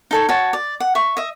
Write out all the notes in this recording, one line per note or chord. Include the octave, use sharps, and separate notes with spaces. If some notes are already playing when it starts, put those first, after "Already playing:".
D#4 A4 C#5
F#4 C#5 A5
D5
F#5
E5 C#6
D#5 E5